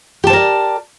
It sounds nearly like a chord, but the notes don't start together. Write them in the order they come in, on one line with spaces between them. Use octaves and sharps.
G4 A5 C5 A#4 D5